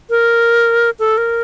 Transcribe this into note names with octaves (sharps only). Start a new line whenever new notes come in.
A#4
A4
A#4